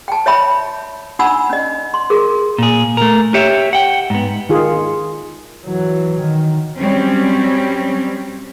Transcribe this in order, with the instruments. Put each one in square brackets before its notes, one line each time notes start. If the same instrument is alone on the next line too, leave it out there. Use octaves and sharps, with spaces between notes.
[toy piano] G5 A5
C#5 E5 G5 B5
D4 D#4 F#5 G#5 B5 E6
C#4 D#5
C6
G#4 A#4
[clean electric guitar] A#2 G#4
A3 A#4
G4 C#5 E5
F#5 G5
G#2 B3
[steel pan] D#3 F4 G#4
[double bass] E3 F#3
D#3
[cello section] F#3 G3 C4 C#4